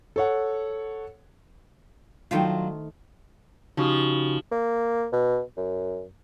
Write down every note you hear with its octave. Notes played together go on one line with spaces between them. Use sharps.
A4 C#5 F#5
D#3 F#3 A3 D4 F4 C5
C#3 F3 D#4 F#4 G4
A#3
B2
F#2